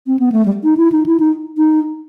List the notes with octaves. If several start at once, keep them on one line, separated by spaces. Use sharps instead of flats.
C4
B3
A3
G3
D#4
E4
D#4
E4
D#4
D#4